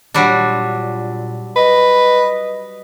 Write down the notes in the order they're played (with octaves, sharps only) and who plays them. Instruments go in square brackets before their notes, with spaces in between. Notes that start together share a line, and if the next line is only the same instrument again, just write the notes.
[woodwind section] A#2 [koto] F#3 G3 D4
[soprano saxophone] B4 [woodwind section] D#5